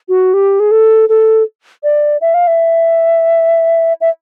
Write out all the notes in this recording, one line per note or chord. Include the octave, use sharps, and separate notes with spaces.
F#4
G4
G#4
A4
A4
D5
E5
F5
E5
E5